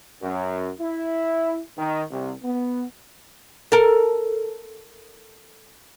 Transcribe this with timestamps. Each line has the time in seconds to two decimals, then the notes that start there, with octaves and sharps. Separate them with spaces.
0.21 F#2
0.80 E4
1.77 D#3
2.11 C2
2.43 B3
3.72 A4 A#4